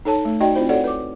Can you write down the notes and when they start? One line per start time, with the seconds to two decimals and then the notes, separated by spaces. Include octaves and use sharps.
0.05 D#4 A4 C#5 A5
0.25 A3
0.41 D#4 F#4 D5 D#5 G5
0.56 C4 E4 F4 C5
0.69 F#4 A4 C#5 D5 F#5
0.84 B4 D6